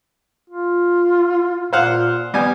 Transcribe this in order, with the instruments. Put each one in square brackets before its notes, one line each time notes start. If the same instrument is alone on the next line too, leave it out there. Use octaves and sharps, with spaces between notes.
[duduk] F4
[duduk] A#2 [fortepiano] C5 F5 F#5
[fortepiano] G3 G#5 [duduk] B3